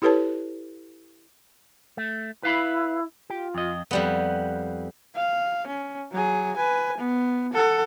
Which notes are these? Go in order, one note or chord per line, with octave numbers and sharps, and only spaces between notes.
E4 G4 A4 B4 C#5 A5
A3
E4 B4 F5 B5
F4 G4
F2 D#5
F2 G3 B3
F5
C#4
F#3 G#4
B4 G#5
B3
A4 F#5